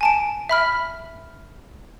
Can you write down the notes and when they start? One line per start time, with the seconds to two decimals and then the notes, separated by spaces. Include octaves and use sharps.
0.01 G#5 A5 D7
0.49 E5 B5 F6